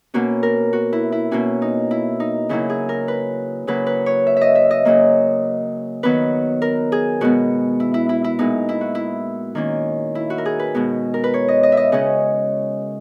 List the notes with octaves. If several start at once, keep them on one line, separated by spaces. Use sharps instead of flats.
B2 A#3 C#4 F#4
A#4
F#4
E4
E4
B2 A#3 C#4 F#4
D#4
E4
D#4
C#3 F#3 A#3 C#4 E4
G#4
A#4
B4
C#3 F#3 A#3 B4
B4
C#5
E5
D#5 E5
E5
D#5
C#3 F#3 A#3
D#3 F#3 B3 B4
A#4
G#4
B2 G#3 B3 F#4
E4
E4
E4
E4
A#2 G#3 B3 D#4
E4
F#4
E4
D#3 A#3 C#4
E4
F#4
A#4
G#4
B4
B2 G#3 B3
A#4
B4
C#5
D#5
D#5
E5
D#5
C#3 G#3 C#4 D#5